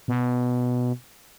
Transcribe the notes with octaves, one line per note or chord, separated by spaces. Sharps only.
B2